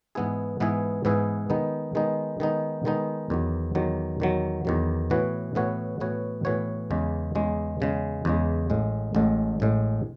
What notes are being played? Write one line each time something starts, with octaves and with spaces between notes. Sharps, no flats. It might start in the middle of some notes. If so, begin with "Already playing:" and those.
G#2 E3 B3 E4 G#4
G#2 E3 B3 E4 G#4
G#2 E3 B3 E4 G#4
D#3 G#3 B3 D#4
D#3 G#3 B3 D#4
D#3 G#3 B3 D#4
D#3 G#3 B3 D#4
E2 D#3 F#3
E2 D#3 F#3
E2 D#3 F#3
E2 D#3 F#3
A2 E3 B3 F#4 C#5
A2 E3 B3 F#4 C#5
A2 E3 B3 F#4 C#5
A2 E3 B3 F#4 C#5
E2 C#3 G#3
E2 C#3 G#3
E2 C#3 G#3
E2 C#3 G#3
A1 A2 G#3
A1 A2 G#3
A1 A2 G#3